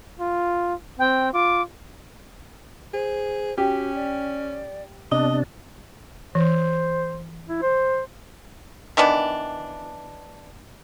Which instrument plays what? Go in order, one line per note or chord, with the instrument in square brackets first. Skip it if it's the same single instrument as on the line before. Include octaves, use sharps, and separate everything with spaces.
[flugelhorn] F4
[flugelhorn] C4 [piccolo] G5
[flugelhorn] F4 [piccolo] D6
[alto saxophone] G#4 [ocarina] C5
[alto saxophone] C#4 [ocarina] F#4 [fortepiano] G4
[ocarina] D5
[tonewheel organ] C3 D4 [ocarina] B3 [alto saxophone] D#5
[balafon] E3 [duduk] C5
[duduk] E4
C5
[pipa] D#3 E3 B3 D4